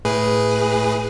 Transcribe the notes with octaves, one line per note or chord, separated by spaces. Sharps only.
A2 G#4 B4